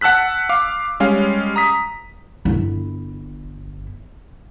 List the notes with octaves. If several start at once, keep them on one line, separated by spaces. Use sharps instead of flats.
F#5 A5 E6 F#6 B6
F5 D6
G3 G#3 C#4 F5
A#5 D#6 B6
G1 E4